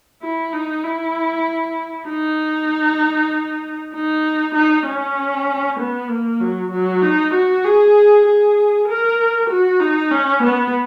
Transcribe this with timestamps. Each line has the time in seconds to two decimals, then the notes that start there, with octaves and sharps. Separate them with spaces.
0.22 E4
0.53 D#4
0.84 E4
2.09 D#4
3.94 D#4
4.55 D#4
4.87 C#4
5.79 B3
6.10 A#3
6.41 F#3
6.72 F#3
7.03 D#4
7.34 F#4
7.65 G#4
8.26 G#4
8.88 A#4
9.50 F#4
9.80 D#4
10.11 C#4
10.43 B3